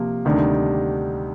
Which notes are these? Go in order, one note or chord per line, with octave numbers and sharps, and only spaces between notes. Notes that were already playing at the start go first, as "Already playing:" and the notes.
Already playing: C3 F3 A#3
D2 C3 D#3 G3 D4